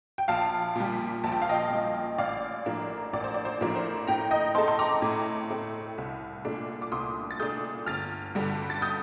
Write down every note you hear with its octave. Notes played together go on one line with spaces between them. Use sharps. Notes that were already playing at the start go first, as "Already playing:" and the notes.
G5
A#1 F5 A5
A#2 G3
A#1 A5
G5
F5
D#5 G5
A#2 G3
A1 D5 F5
A2 F3 A#3 D4
A1 D5
C5
D5
C5
A2 F3 A#3 D4
C5
A2 G5 A#5
D#5 G5
A3 C4 A5 C6
C6
A#5 D6
A2
A3 C4
C2
A#2 A3 D4
D6
C2 C6 D#6
A6
A#2 A3 D4 D#6 G6
G1 F6 A6
G2 D3 G3
A6
D#6 G6